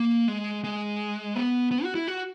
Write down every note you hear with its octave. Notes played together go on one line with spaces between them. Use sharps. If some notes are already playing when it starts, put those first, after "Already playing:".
Already playing: A#3
G#3
G#3
B3
B3
F#4
E4
F#4